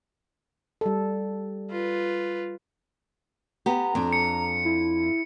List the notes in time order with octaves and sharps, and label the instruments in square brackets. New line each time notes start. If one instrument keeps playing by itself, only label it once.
[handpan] G3 A4
[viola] F4 B4
[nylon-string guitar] B3 G4 [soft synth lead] A#5
[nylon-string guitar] F2 D4
[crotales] C#7
[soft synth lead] E4